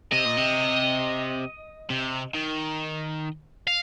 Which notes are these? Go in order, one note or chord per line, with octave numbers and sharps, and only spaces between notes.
C3 D#5
A#2
C3
C3
D#3
F5